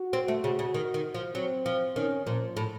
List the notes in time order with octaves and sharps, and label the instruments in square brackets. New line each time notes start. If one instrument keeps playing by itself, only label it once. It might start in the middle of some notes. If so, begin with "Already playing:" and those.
Already playing: [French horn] F#4
[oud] C4
A3
C#3
C#3
D#3
D#3
F3
[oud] F#3 [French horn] C4
[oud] F3
[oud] D#3 [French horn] C#4
[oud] A#2 [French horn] F3
[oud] A2